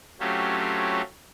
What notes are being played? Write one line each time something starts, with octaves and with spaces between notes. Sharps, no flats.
F#3 A3 C4 C#4 F4 G4